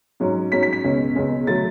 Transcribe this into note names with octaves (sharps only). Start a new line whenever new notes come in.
G#2 F#3 C#4
G#2 F#3 C#4 B6
B6
B6
C#2 B2 G#3 C#4
C#2 B2 G#3 C#4
D3 F#3 A3 A6